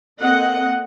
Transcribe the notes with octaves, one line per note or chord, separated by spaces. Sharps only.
A#3 C4 A4 D#5 F#5